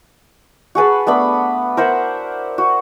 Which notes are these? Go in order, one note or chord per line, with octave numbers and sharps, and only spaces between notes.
F#4 G#4 B4 A5
A3 B3 D4 B5
A#4 C5 E5 F#5
F#4